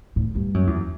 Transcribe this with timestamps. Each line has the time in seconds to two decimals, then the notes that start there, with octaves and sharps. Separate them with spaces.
0.16 A2
0.35 G2
0.54 F#2
0.67 E2